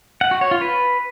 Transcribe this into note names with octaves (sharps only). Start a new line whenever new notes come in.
F#5
F#4
C#5
F4
B4